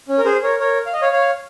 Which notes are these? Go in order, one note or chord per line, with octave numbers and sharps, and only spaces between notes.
C#4
A#4
G#4 C5
A#4 C#5
A#4 C#5
F5
D#5
C#5 F5
C#5 F5